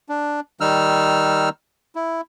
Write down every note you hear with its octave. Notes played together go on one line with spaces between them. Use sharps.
D4
D#3 G3 D#4 E6 F6
E4